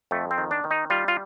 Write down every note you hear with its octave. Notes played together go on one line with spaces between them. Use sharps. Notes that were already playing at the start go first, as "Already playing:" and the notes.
F2 A3
C4
D#3
D4
D#3
D#4
G3 F4
F4